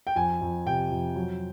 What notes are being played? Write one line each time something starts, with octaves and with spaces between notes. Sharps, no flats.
G5
F2 G#5
F2
C3 G5
F2
F#3